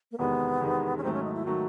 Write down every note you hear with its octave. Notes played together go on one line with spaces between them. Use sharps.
A#3
E2 C3 D#3 G#3 B3
E2 C3 D#3 G#3
C#4
G#2 D#3 F#3 A3 C4
C#4
D#4
E4
D#3 F#3 A3 F#4